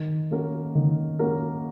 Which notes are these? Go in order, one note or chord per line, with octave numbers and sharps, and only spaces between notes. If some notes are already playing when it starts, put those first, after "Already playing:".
Already playing: D#3
A#3 C#4 F#4 A#4
D#3
A#3 C#4 F#4 A#4